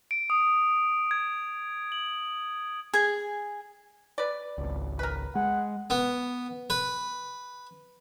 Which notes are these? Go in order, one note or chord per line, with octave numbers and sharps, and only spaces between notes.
D7
D#6
G#6
F#7
G#4 G#5
B4 D5
G#1 C#2
A#4 B4
G#3 F#5
B3
B4